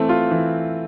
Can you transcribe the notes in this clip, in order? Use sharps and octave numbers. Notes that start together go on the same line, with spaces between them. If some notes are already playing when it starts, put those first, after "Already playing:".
Already playing: E3 A3 C4
F4
E3